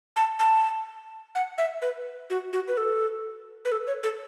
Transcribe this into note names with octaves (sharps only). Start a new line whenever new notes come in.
A5
A5
F#5
E5
B4
F#4
F#4
B4
A4
B4
A4
C#5
A4